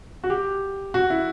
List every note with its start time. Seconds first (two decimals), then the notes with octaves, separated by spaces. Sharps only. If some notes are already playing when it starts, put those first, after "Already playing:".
0.24 F#4
0.30 G4
0.94 F#4
1.10 E4